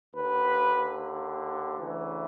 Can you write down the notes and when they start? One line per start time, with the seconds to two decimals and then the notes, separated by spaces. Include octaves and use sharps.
0.15 D#2 D3 B4
1.78 D2 C#3 E3